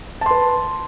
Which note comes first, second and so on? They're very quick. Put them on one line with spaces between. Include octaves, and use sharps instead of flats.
A5 C6 B4